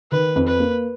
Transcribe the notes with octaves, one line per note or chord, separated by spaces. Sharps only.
D#3 B4
F2
B4
A#3